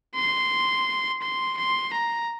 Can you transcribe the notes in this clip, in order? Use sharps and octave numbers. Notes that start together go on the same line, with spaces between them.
C6
C6
C6
A#5